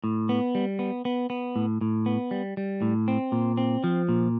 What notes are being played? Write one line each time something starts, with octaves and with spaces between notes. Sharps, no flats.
A2
B3
G3
B3
B3
B3
A2
A2
B3
G3
G3
A2
C4
A#2
C4
F3
A#2